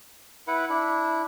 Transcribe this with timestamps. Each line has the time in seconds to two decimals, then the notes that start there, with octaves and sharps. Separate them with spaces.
0.47 E4 B4 F#5
0.69 D4 E4